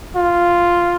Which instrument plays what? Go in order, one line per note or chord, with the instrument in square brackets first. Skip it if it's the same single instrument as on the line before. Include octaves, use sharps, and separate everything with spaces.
[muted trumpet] F4